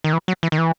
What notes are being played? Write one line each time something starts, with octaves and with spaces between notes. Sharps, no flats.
D#3
E3
F#3
E3
D#3
E3